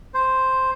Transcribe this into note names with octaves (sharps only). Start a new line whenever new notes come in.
C5